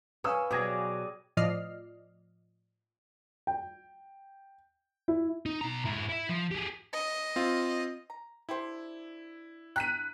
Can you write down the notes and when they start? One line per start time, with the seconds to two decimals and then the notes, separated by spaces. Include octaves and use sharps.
0.24 C#4 B4 F5 G#5 C#6 D#6 E6
0.51 B2 F#3 G4 G#4 D5 D#6 G#6 A#6
1.37 A2 F3 D5 D#5 F6 C7
3.47 G5
5.08 E4
5.46 D#4
5.61 B2 A#5
5.85 G#2 E4
6.09 E4 E5
6.29 F3
6.51 G4 G#4
6.93 D#5
7.36 C4 F4
8.10 A#5
8.49 D3 E4 G4 C5
9.76 G5 A#5 F#6 B6 D#7